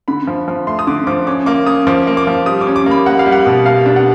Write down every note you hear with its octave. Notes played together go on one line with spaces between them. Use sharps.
D3 B5
F3
F3
A3 C6
D#6
D3 D6
F3 D6
C#4 D6
A#3 D6
C#4 D#6
F3 D6
A#3
D6
F3
G3 D#6
D6
C#4
D6
A#3 B5
A#3 F#5
F5
G3
F#5
B2
A#3 F5
D4
F#5